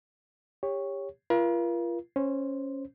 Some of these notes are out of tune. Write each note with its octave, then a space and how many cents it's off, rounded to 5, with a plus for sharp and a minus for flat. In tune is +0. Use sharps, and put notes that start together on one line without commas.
G4 +25 C#5 +0
F4 -30 A#4 +40
C#4 -10 C5 +0